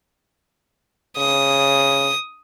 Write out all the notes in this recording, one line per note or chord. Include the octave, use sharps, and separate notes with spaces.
C#3 D#6